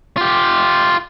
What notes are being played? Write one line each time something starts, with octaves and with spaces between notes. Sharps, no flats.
F4 G4